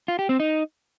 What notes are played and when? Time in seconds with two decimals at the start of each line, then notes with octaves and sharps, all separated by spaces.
0.08 F4
0.19 G4
0.29 C4
0.40 D#4